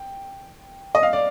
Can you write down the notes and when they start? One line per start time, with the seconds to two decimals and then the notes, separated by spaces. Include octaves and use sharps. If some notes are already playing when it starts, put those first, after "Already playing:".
Already playing: G5
0.95 D#5
1.03 F5
1.13 D5